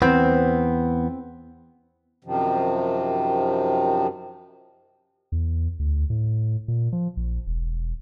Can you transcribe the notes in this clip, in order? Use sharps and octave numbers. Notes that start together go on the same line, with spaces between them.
E2 B3 C4
F#2 C3 D#3 F3
E2
D2
A2
A#2
F3
A#1
E1